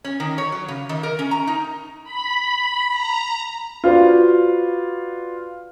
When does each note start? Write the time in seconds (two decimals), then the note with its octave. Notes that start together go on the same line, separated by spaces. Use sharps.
0.04 C#4
0.20 D#3
0.38 C#5
0.52 F#3
0.68 C#3
0.89 D#3
1.03 A#4
1.19 C#4
1.31 A#5
1.47 D#4
2.04 B5
2.91 A#5
3.84 F4 F#4 B4 C5 D5